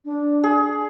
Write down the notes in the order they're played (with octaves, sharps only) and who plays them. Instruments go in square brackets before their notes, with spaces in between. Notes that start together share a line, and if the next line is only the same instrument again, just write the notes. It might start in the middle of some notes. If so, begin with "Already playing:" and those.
[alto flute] D4
[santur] G#4